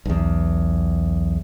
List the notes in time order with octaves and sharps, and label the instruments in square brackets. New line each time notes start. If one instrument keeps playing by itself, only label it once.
[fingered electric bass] B1 E2